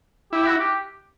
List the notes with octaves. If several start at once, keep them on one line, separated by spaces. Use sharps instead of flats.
E4 G4
F#4
G4